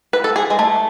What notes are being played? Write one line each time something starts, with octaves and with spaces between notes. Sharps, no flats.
B4
A4
G#4
G#3
A3